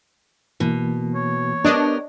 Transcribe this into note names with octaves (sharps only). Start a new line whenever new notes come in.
B2 E3 A#3
C#5
B3 D4 G4 A#4 D#5